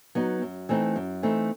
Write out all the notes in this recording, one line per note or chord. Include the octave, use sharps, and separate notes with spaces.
F#3 B3 D#4
F#2
E3 A3 C4 D#4
F#2
E3 A3 C4 D#4